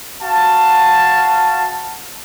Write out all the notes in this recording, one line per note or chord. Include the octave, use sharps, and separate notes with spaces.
F#4 F5 A5